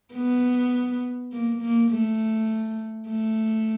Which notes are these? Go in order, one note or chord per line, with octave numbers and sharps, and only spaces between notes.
B3
A#3
A#3
A3
A3